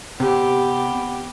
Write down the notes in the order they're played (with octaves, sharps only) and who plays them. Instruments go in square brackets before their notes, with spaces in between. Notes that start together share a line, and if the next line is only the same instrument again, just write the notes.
[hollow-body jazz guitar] C3 [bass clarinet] B3 [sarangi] G4